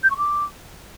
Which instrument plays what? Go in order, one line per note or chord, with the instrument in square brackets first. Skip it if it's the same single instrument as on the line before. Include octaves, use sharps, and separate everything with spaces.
[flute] G6
C#6
D6